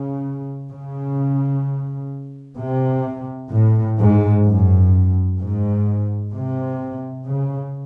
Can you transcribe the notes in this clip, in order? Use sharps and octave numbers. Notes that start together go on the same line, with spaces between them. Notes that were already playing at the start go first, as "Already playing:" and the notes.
Already playing: C#3
C#3
C3
A2
G#2
F#2
G#2
C3
C#3